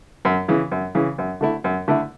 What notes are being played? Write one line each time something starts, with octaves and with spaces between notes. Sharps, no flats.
F#2
C#3 E3
F#2
C#3 E3
F#2
D3 A3 E4
F#2
D3 A3 E4